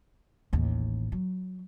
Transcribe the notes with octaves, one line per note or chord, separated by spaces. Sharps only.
A1 D#2
F#3